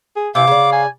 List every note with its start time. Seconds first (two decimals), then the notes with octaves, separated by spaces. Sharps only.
0.16 G#4
0.35 C3 E3 F5 D6
0.47 C#3 D4
0.72 G#5